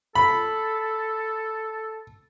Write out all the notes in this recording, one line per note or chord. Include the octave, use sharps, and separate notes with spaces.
A4 B5